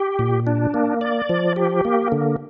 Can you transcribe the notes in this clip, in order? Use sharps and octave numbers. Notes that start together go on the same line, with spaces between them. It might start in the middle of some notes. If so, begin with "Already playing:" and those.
Already playing: G4
A#2
D4
A#3
D5
F3
G4
A#3
D3